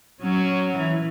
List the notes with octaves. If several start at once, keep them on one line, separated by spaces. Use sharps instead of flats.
F#3 C#4
E3